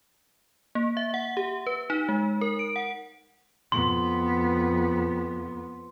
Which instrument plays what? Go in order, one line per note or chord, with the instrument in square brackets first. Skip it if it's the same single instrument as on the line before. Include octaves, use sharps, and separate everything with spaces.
[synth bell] A#3
E5
F#5
G4
B4
D#4
G#3
A#4
D7
F#5
[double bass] F2 [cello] B3 [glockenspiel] C6